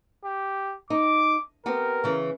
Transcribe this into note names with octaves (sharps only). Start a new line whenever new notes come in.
G4
D#4 D6
B3 C4 G4 A#4
C#3 E3